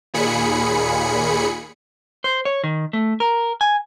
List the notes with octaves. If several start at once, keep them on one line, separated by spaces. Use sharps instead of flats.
D#2 A#2 G#4 B5 C#7
C5
C#5
D#3
A3
A#4
G#5